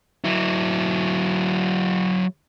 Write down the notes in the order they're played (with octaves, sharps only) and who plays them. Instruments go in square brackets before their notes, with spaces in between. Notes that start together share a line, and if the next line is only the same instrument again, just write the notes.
[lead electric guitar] F#3 E4